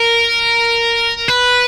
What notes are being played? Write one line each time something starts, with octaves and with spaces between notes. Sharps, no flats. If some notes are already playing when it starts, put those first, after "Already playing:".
Already playing: A#4
B4